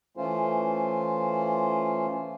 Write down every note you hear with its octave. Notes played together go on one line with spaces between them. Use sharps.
E3 A3 C#4 F4 C5